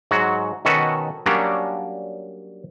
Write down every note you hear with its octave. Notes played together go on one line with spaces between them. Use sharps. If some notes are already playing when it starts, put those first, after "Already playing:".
G#2 F#3 F#4
B2 D#3 C#4 F#4 A4 B4
F#3 G3 A#3 C#4 D4 A#4